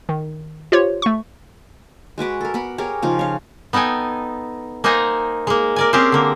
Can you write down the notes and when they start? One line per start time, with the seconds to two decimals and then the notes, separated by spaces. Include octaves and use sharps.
0.09 D#3
0.72 F4 G4 C5 C#5
1.02 A3 C#6
2.18 G#3 F#4 B4 D6
2.41 A4 A#4
2.54 B3 A#4 B5
2.78 G4 G#4 A#4 C#5
3.02 C#3 F3 D#4
3.19 C#5 F5
3.73 B3 D#4 A4 G5 G#5
4.84 A#3 D#4 C5 F#5 G#5 A#5
5.47 G#3 A#3
5.76 A#4 D5 G#5
5.93 C4 C#4 G4 G#4 A#4 C5
6.12 D3 A#3 A#4